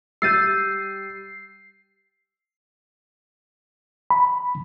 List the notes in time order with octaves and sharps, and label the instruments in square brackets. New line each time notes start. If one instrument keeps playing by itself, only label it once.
[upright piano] G3 A6 D#7 [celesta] E6 G6 [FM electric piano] C7
[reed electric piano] B5